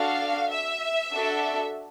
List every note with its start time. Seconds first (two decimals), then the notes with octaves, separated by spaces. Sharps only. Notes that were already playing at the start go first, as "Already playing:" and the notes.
Already playing: D4 F#4 A4 F5
0.51 E5
1.13 D4 F#4 A4